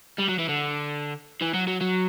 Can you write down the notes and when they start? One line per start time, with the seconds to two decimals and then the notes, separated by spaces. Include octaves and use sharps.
0.19 G3
0.29 F#3
0.39 E3
0.49 D3
1.41 E3
1.54 F#3
1.68 F#3
1.81 F#3